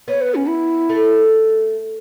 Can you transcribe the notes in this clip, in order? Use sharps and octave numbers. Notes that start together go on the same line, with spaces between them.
B3 C#5
B4
C#4
E4
A3